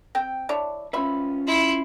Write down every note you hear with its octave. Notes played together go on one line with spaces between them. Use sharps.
C4 G5
D4 E4 C#5
C#4 F4 B4 C5 E5 B5
E4 C6